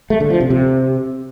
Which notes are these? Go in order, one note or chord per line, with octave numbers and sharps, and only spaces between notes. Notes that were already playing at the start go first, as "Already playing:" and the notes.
A3
D3
F3
C3
C3